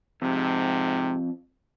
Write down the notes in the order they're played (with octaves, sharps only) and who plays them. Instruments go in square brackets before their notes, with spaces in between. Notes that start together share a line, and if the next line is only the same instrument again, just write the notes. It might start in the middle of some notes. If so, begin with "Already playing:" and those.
[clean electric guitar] F2 [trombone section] G#2 C3